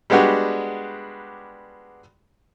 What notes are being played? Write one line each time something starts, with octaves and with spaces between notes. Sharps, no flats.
G3 G#3 B3 D4 F#4 G4